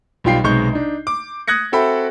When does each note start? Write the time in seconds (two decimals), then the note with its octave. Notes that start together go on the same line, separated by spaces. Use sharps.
0.24 B1 G3 F4 G5 C7
0.44 B1 C3 G#3 C#6 G6
0.73 D4 D#4
1.07 D6
1.47 D#6 F#6 G#6 A#6 C#7
1.72 C4 F#4 A4 E5 G5 B5